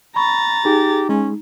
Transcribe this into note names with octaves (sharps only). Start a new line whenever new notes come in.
A#5 B5 C#6 A6
D#4 G4 G#4
G#3 C#4